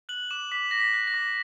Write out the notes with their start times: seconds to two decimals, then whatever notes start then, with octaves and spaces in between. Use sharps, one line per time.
0.09 F#6 F#7
0.31 D6 E7
0.52 D6 B6
0.71 D6 A#6
0.80 B6
0.94 F#6
1.08 A#6
1.14 D6